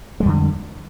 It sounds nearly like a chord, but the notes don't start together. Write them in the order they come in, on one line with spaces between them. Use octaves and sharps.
G#3 G3 F2 D3